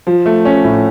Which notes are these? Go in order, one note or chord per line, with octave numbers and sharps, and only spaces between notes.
F3
A3
C#4
A2